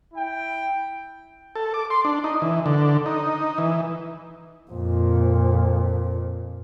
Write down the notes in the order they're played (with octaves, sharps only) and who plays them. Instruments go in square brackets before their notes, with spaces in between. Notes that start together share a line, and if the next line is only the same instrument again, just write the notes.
[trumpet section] E4 G5
[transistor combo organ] A4
D6
C6
D4
D#4
E3
D3
D#4
E3
[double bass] F2 A#2